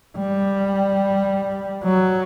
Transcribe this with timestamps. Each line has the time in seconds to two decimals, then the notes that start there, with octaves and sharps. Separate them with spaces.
0.18 G3
1.85 F#3